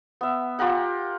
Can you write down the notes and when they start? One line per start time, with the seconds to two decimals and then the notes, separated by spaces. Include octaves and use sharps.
0.21 B3 E5
0.59 F4 G4 A#4 F#5